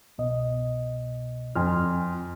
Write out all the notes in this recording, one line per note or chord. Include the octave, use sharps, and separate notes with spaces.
C2 B2 D#5
F2 G#5 C6 F6